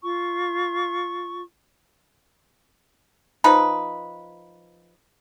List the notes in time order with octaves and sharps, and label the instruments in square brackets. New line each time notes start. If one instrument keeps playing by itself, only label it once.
[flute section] F4 C#6
[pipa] F3 D#4 B4